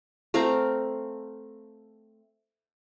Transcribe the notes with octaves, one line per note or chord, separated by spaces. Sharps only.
A3 C4 F5 A#5